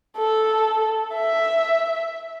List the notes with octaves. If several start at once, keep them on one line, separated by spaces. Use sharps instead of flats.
A4
E5